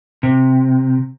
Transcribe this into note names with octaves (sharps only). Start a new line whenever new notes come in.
C3